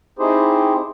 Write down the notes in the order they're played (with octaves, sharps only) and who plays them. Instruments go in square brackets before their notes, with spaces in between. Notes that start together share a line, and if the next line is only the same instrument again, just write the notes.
[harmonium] C4 D#4 E4 G4 G#4 C5